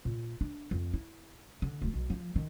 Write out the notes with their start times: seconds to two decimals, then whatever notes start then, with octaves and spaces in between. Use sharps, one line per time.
0.05 A#2
0.41 D4
0.71 F2
0.94 E4
1.62 D3
1.82 D1
1.94 B1
2.10 F3
2.36 D#3